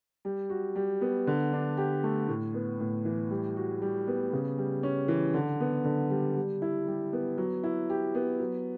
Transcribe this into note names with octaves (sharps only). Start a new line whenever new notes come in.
G3
F#4
G3
B3
D3
D4
G4
A3
A2
B3
A2
E3
G3
F#4
G3
B3
C#3
G3
C#4
E3
D3
B3
D3
G3
G3
E4
G3
B3
F#3
E4
G4
B3
F#3